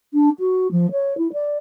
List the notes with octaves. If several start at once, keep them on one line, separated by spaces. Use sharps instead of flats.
D4
F#4
F3
C#5
E4
D5